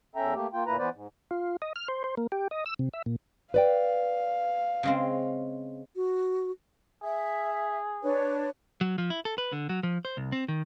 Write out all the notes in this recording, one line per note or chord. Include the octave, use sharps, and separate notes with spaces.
E2 C#4 A4 E5 G5 A#5
A3 A#3 G4
A#3 F4 G5
D2 A#2 A#3 E4 B4 A#5
E3 B3 B4 C5 D5
G#2
F4
D#5
F6
C5
C5
A#3
G4
D#5
E6
C3
E5
A#2
B4 D5 F5 G5
C#3 G#3 C4
F#4
G#4 E5
D4 B4 C#5
F#3
F3
E4
A4
B4
D3
F#3
F3
C5
C2
C4
D#3